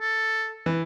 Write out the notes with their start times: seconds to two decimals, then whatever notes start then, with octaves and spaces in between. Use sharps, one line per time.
0.01 A4
0.66 E3